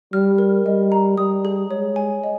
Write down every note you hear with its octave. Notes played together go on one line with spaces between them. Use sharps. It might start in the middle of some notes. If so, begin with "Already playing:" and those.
G3 F6
A#4
G3 D#5
A#5
G3 D#6
G#4
G#3 C#5
G#5
D#5